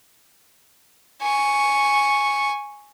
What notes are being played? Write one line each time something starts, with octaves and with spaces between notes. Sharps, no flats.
G#5 C#6